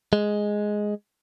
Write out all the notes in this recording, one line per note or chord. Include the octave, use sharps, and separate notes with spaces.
G#3